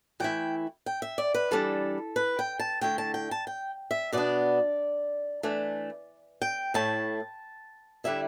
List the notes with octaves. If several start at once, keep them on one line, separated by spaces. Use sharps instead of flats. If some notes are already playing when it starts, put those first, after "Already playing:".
E3 A3 E4 G5
G5
E5
D5
B4
E3 G3 D4 A4
B4
G5
A5
D3 A3 E4 G5
A5
G5
A5
G5
E5
B2 B3 D4 D5
E3 A3 D4
G5
A2 A3 E4 A5
D3 G3 E4 E5